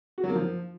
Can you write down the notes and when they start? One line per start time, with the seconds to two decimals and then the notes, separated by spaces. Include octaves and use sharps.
0.18 F#4
0.24 F#3
0.29 A#3
0.35 F3